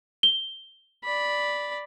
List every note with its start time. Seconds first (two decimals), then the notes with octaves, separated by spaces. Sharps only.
0.23 G7
1.04 D5 B5